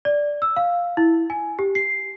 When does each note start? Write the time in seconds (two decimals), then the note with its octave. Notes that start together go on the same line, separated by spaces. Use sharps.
0.05 D5
0.42 E6
0.56 F5
0.97 E4
1.30 G#5
1.59 G4
1.75 C7